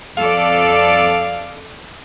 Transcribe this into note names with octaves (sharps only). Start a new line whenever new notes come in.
F2 A4 D5 F5